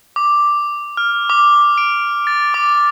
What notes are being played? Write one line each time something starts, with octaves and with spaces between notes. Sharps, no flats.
D6
F6
D6
D7
A6
D6